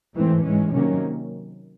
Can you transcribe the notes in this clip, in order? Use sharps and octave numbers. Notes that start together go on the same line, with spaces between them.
G#2 E3 A3 C4
G#2 E3 G#3 C#4
C3 D#3 F#3 A#3 C#4